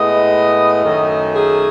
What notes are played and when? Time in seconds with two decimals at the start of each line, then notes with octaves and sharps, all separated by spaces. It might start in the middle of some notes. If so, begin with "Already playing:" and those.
Already playing: A2 G#3 B3 D#5
0.84 F#2 D#3 F#3 A3
1.33 G#4